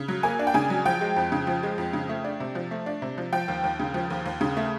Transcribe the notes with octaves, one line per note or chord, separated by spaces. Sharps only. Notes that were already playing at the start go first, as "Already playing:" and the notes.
Already playing: C#3
F#3
A#3 G#5
D4
G5
C#3 G#5
F#3
F3 G5
G#3
F2
C#3
F3
G#3
F2
C#3
A3
D4
C3
F3
A3
D4
C3
F3
F3 G5
D#2
D#2
C#3
F3
D#2
D#2
C#3
A3